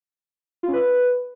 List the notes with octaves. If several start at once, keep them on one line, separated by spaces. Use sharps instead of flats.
F4
C#4
B4